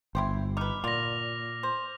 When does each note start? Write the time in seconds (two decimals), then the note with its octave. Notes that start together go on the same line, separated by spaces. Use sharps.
0.15 G1 E4 G4 C5
0.57 D#4 B4 D6 F6
0.84 A#2 F#3 F4 D5 A#6 F7
1.63 C5